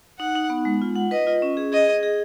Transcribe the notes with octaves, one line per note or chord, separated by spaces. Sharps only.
D#4 F#5
D#4
B3
G#3
F4
F#5
B4 D#5
F4
C#4
G#4
G#4 D#5
G#4
G#4